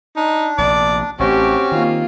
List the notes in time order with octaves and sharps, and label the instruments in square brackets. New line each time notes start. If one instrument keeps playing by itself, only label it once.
[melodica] D4 [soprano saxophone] D#4
[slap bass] A#1 C3 [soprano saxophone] D5
[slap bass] A1 [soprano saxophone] C4 [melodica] C#4 F#4 [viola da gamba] G4
[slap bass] D#3 [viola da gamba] A#3 F4